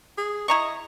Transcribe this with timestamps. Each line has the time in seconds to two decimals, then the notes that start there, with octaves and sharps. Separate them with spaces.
0.18 G#4
0.48 E4 D#5 A#5 C#6